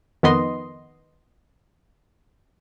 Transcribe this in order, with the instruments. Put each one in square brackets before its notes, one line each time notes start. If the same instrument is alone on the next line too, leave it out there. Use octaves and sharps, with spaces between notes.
[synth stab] F2 D#3 B3 D#5 C6